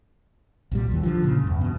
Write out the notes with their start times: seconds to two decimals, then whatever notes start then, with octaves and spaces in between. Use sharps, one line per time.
0.71 C2 A#2 G3
0.91 D#2 E3
1.03 D3 F3
1.24 A#2 C#3
1.44 E2 G2
1.61 B2